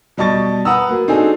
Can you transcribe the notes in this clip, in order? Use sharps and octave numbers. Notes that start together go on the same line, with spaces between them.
B2 G3 D#5 A5 C#6 A6
B4 F#5 A#5 D#6 E6
F#3 A#3
C4 D4 D#4 F#4 G#4 A4